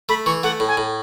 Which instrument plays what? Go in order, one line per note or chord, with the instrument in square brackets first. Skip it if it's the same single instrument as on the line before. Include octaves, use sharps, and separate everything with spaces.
[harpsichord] A3 [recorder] B5
[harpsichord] E3 [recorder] C#6
[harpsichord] A3 [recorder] F#5
[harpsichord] A2
[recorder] G#5
[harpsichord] A2